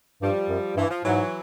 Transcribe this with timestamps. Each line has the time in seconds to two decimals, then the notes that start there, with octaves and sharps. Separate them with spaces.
0.22 G2 F3 G3
0.48 F#2
0.76 G2 E3
0.90 F3
1.04 G#2 E3 F#3